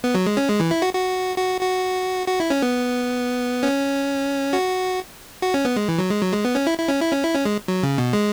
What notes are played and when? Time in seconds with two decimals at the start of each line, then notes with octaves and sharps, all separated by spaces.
0.04 B3
0.15 F#3
0.26 G#3
0.37 C#4
0.48 G#3
0.60 E3
0.71 E4
0.82 F#4
0.93 F#4
1.38 F#4
1.61 F#4
2.28 F#4
2.40 E4
2.50 C#4
2.62 B3
3.63 C#4
4.53 F#4
5.42 F#4
5.54 C#4
5.65 B3
5.76 G#3
5.88 E3
5.99 F#3
6.10 G#3
6.22 F#3
6.33 G#3
6.45 B3
6.55 C#4
6.67 E4
6.78 E4
6.88 C#4
7.01 E4
7.12 C#4
7.23 E4
7.33 C#4
7.45 G#3
7.68 F#3
7.83 C#3
7.98 B2
8.13 G#3